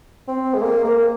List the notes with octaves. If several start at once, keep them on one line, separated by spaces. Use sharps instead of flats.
C4
G#3
A#3
A#3